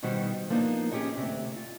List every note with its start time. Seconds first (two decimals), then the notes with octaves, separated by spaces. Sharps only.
0.03 B2 D#3 G3 D#4 F#4 C5
0.50 F3 A#3 B3 D4 D#4
0.92 C#4 G4 G#4 C#5 D#5
1.17 D2 C3
1.56 F4